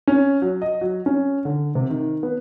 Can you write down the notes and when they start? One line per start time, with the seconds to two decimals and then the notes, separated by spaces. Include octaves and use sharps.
0.07 C#4
0.42 F#3
0.62 D#5
0.81 F#3
1.06 C#4
1.45 D3
1.75 C3
1.90 D#3
2.23 B3